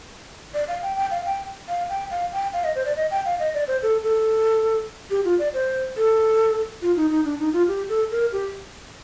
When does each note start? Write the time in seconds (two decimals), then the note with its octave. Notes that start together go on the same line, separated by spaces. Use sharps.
0.54 D5
0.68 F5
0.82 G5
0.97 G5
1.11 F5
1.26 G5
1.69 F5
1.89 G5
2.11 F5
2.33 G5
2.53 F5
2.64 D#5
2.75 C5
2.85 D5
2.97 D#5
3.11 G5
3.26 F5
3.40 D#5
3.54 D5
3.68 C5
3.83 A4
4.04 A4
5.11 G4
5.25 F4
5.39 D5
5.54 C5
5.97 A4
6.82 F4
6.96 D#4
7.11 D#4
7.25 D4
7.39 D#4
7.53 F4
7.68 G4
7.89 A4
8.11 A#4
8.32 G4